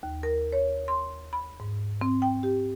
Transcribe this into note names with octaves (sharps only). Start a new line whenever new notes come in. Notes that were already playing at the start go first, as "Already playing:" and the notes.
D#2
A#4
C#5
C6
B5
G#2
C4
G5
G4